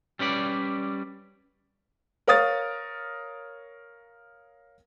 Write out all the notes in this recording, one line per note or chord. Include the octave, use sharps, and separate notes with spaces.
G3 C#4 B4 D5
A#4 C#5 F5 D#6 A6